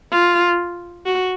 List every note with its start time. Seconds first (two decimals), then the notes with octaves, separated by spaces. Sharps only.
0.12 F4
1.07 F#4